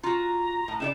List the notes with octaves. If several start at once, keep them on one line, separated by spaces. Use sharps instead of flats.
F4 F#4 A#5
A2
C#3 D#4 D5 E7